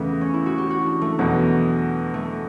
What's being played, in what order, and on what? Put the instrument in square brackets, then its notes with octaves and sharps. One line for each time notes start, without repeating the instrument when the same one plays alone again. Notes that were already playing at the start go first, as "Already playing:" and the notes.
Already playing: [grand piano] E2 C#3 [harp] A3 B3
[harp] C#4
E4
F#4
G4
F#4
D4
A3
[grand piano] E2 B2 F#3 [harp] B3
[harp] A3